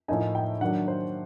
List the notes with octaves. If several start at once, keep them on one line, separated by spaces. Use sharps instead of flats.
A2 F3 A#3 D#4 G#5
G5
D#3 F#3 A#3 D4 F#5
C5